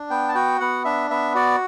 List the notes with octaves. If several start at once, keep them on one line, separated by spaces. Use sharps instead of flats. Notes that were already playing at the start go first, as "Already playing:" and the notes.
Already playing: D4
B3 G5
A5
F#4 G5
B3 F#5
D4 E5
B3 E5
F#4 D5